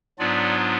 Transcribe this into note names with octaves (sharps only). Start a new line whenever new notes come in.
G#2 F#3 B3 D4 F4 D5